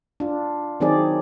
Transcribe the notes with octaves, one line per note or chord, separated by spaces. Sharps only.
D4 F4
D#3 F#3 C4 D#4 G#4 D5